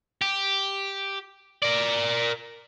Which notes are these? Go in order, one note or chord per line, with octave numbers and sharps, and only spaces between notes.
G4
A#4 D5